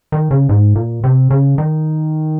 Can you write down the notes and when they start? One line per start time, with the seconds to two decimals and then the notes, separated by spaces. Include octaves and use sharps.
0.12 D#3
0.31 C#3
0.49 G#2
0.76 A#2
1.04 C3
1.31 C#3
1.58 D#3